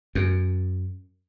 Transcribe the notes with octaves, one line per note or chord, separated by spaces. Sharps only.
F#2